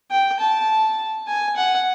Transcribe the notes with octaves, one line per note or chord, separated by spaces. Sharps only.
G5
A5
G#5
F#5